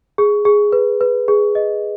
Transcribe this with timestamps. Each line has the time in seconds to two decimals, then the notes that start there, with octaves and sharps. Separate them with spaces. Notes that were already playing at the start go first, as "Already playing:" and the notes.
0.18 G#4
0.45 G#4
0.72 B4
1.01 B4
1.28 G#4
1.55 D#5